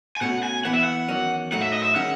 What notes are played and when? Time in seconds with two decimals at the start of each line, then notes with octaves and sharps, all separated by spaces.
0.17 G#5
0.21 B2 A3 C#4 F#4 F#5
0.43 G#5
0.65 E3 B3 E4 B4 F#5
0.74 E5
0.84 F#5
1.08 E2 D#3 F#3 C#4
1.52 A2 F#3 A3 D#4 F#5
1.62 E5
1.73 D#5
1.83 E5
1.95 D#3 G#3 C#4 F#5